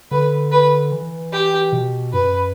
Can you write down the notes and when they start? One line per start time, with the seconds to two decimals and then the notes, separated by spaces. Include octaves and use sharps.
0.11 D3 B4
0.52 B4
0.92 E3
1.32 G4
1.72 B2
2.13 F#2 B4